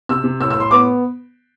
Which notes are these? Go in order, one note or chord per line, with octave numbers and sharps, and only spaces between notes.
C3 E6
C3
A2 E6
A2 E6
C6
B3 D6